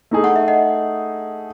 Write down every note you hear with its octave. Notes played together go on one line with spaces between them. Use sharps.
A3 D#4 G#4
F#5
E5
D#5 F#5